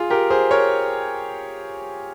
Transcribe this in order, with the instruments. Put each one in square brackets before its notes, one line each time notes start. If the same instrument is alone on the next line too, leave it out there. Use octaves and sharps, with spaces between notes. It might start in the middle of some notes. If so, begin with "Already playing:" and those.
Already playing: [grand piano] F4 G#4
G4 A#4
G#4 C5
A#4 C#5